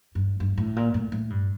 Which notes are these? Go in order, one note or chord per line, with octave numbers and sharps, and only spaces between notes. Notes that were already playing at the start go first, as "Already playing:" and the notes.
G2
G2
A2
A#2
A2
A2
G2